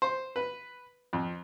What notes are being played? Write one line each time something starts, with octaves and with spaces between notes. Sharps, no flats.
C5
B4
F2